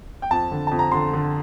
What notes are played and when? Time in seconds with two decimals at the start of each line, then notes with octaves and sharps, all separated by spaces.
0.22 G5
0.30 F2 A5
0.52 D3
0.67 F2 A5
0.79 A#5
0.92 D3 C6
1.13 D3